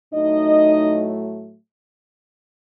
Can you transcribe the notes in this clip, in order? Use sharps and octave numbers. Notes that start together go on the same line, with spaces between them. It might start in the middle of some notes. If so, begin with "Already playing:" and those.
A2 F#3 A3 D#4 D#5